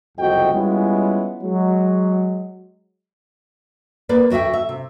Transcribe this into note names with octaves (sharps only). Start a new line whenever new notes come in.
F#1 C2 F2 F#4 D#5 G5
G3 G#3 B3 C#4 E4 F4
F#3 G#3
A#3 B4 D5
D2 F#4 D#5 E5 G5
E5
C3